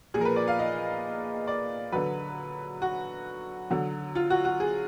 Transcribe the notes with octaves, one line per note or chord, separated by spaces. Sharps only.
A#2 F3 G#4 A#4
B4
D5
F5
D#5
D5
D3 F#3 B4
F#4
D3 F#3
F4
F#4
F#4
G#4